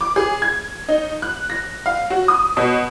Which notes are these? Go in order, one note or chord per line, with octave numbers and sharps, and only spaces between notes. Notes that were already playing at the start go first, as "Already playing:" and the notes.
D6
G#4
G#6
D#4
F#6
A#6
F5
F#4
D#6
B2